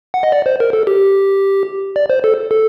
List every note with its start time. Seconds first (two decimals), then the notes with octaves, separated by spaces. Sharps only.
0.14 F#5
0.23 D#5
0.32 D5
0.46 C5
0.60 A#4
0.73 A4
0.87 G4
1.96 D5
2.10 C5
2.24 A4
2.51 A4